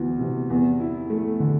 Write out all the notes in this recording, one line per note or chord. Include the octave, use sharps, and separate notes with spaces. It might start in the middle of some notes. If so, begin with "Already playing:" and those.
Already playing: D2 E3 B3
C3
E2
E4
A3
D3